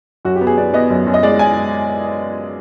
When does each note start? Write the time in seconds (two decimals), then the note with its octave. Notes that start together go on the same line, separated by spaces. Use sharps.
0.25 F#2 F#4
0.36 G4
0.41 B3
0.47 G#4
0.57 B3 D5
0.74 B3 D#5
0.90 F#2
1.07 F#2
1.14 D#5
1.23 G#3 D5
1.39 G#5